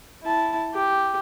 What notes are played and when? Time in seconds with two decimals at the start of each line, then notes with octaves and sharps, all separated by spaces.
0.23 E4 A5
0.75 G4